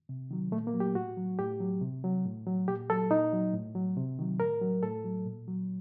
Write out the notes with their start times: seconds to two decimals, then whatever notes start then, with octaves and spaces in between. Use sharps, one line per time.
0.09 C3
0.31 D#3 F#3
0.52 A#2 A3
0.67 A#3
0.74 F#3
0.80 G4
0.95 A2 F#4
1.17 F#3
1.39 A2 G4
1.60 F#3
1.81 C3
2.04 F#3
2.25 A2
2.47 F#3
2.68 A#2 G4
2.90 F#3 A4
3.11 A#2 D#4
3.33 F#3
3.54 A2
3.75 F#3
3.97 C3
4.19 D#3 F#3
4.40 A2 A#4
4.61 F#3
4.83 A2 A4
5.05 F#3
5.26 A#2
5.48 F#3